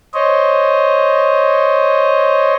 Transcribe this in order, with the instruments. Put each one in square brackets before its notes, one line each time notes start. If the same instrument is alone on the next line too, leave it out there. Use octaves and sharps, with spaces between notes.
[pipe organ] C5 C#5 D#5